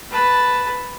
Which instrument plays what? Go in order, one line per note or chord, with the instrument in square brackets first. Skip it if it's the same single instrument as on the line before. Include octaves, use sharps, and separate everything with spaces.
[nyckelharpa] B4 A5